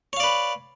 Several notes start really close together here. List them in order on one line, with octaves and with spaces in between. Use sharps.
C#5 F5 D5 B4